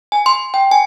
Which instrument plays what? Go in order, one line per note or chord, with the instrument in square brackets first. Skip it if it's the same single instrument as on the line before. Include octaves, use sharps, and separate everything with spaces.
[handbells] G#5
C6
G5
G#5